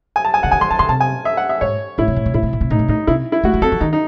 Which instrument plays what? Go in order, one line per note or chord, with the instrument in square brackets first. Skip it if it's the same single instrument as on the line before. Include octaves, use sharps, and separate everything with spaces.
[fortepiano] G#5
A5
G#5
[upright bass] C#3 [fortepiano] F#5
[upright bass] D#3 [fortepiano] G#5
[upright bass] E3 [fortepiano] C6
[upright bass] D#3 [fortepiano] A5
[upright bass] C#3 [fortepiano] C6
[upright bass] C3 [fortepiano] A5
[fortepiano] G#5
E5
F#5
E5
[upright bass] G#2 [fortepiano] C#5
[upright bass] A2 [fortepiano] E4
[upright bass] C3
A2
C3
[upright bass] A2 [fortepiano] E4
[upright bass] C3
A2
C3
[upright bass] A2 [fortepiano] D#4
[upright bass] C3
[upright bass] A2 [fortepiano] D#4
[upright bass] C3 [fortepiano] E4
[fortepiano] E4
[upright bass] A3 [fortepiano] F#4
[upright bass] A3
[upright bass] C4 [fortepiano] A4
[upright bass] E3
[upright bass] D#3 [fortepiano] D#4
[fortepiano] D#4